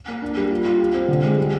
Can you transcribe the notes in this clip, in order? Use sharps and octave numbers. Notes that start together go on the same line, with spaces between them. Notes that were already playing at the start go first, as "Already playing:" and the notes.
A#3
D4
G3
F4
F4
G4
C4
D3
G#3
G3